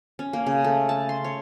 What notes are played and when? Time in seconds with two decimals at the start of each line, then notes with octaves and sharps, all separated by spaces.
0.19 C#4
0.33 A#3
0.46 C#3
0.64 A3
0.89 A5
1.09 C6
1.24 C#5